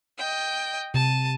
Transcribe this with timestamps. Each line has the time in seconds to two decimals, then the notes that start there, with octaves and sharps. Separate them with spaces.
0.18 D#5 G5
0.94 C3 A5 D#7